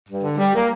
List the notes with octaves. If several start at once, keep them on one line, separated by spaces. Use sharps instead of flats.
G2
D3
G3
A#3